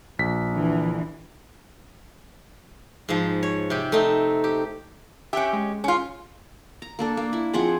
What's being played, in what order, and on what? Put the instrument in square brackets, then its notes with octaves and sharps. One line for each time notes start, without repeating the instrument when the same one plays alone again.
[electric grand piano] A#1 B6
[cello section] D3 E3
[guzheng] G#2 F3
C#5
C3 G4
A3 C4 D#4
G4
[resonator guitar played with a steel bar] C#4 G4 [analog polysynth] E5 G5 F#6
[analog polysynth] G#3
[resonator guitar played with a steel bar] C#4 F4
[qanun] A#5
A#3 D4 A4
A#3
E4
F3 C4 G#4 F#5